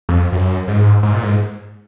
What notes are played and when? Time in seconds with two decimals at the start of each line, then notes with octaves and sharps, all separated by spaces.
0.09 F2
0.32 F#2
0.68 G#2
1.03 G#2
1.13 A#2
1.23 G#2